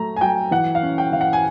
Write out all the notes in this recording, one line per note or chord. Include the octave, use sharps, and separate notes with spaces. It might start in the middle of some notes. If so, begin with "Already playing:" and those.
Already playing: F#3 A3 A#5
G#5
F#3 G5
E3 F#5
F5
C#4
G5
E3 F5
F#5
G#5